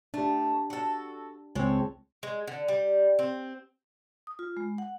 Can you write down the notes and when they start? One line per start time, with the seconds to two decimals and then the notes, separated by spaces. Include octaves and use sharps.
0.14 A3 D4 G4
0.70 F#4 A4
1.55 C#2 G#3 C4 A4 C#5
2.23 G#3
2.48 D3
2.68 G3
3.19 C4
4.27 D#6
4.39 F4
4.57 G#3
4.78 F#5